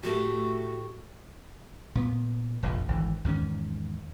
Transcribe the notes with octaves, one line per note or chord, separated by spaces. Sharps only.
A2 A3 F#4 G4
A#2 B3
F1 A#1 F2
G#1 D3 E3
E2 G#2 D#3 C#4